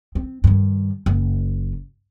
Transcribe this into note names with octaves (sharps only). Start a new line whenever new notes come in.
C4
G2 D#3
F#1